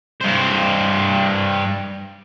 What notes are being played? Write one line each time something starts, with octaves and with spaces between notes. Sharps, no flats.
G2 C5